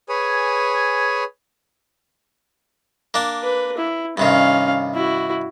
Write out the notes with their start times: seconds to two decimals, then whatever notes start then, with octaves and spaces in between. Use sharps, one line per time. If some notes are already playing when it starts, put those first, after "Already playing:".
0.09 G#4 B4 C#5 G#5
3.14 A#3 D4
3.44 B4
3.78 E4
4.17 G2 C3 D#3 C#4 F5
4.95 E4 F#4